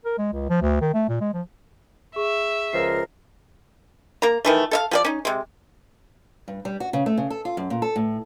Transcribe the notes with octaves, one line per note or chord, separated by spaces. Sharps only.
A#4
G#3
C#2
F3
D2
D#3
A3
A#2
G#3
F3
G#4 E5 C#6
C#2 F3 A#4 C7
A#3 A#5
D#3 E3 A3
A4 E5 F5
F3 G#4 D5
C#4 D#4
C3 G#3
G2
G3
F#4
C#3
A3
C#3
A4
F4
F#2
A#2
A4
A2